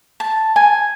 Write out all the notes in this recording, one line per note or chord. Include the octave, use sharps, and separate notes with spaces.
A5
G#5